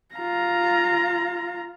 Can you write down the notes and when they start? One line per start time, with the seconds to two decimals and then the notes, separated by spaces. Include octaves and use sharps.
0.15 F4 A#5